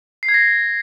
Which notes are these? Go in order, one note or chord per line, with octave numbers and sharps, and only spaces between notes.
C7
G#6
A#6